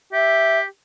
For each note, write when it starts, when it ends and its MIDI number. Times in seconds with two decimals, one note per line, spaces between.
0.12 0.64 67
0.12 0.58 76